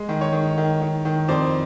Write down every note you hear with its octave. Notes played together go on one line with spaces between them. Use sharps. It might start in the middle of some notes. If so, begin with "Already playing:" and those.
Already playing: G#3
D#3
C#5
D#3
D#3
D#3
D#3
F2 C5 D5